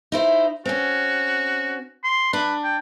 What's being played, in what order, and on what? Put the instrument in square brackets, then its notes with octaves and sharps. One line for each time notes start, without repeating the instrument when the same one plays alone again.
[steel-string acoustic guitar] D#4 E4 C5
[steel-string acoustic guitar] C4 C#4 [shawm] F#4
[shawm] C6
[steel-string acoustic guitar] D4 [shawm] B4
[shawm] G5